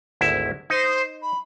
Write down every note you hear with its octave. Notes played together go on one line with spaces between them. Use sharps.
G#1 D2 E4
D#4 C5
B5